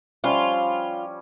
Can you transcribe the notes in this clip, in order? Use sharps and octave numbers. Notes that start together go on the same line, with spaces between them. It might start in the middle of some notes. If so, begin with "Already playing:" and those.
F3 G3 C#4 F4